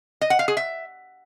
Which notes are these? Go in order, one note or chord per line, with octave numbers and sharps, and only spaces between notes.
D#5
F#5
F5
G#4
E5